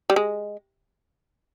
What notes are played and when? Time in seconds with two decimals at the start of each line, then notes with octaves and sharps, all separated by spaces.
0.10 G3
0.16 G#3